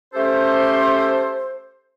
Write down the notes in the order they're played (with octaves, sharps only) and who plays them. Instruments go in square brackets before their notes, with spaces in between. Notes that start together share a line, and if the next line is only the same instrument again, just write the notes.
[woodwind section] A3 C#4 G4 A4 C5